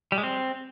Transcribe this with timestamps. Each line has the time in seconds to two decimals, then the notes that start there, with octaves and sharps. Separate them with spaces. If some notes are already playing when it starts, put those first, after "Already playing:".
0.12 G3
0.18 G#3
0.23 C4